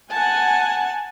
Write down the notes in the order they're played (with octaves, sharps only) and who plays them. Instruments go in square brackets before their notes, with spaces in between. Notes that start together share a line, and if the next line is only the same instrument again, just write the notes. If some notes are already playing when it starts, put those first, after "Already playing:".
[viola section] F#5 G#5 [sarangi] A5